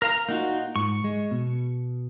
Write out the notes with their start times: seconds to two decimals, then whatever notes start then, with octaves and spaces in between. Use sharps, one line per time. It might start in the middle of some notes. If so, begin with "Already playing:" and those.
0.02 A#4 F5 A#5
0.29 A#3 D#4 F4 F#4
0.76 G#2 C#6
1.04 G#3
1.31 B2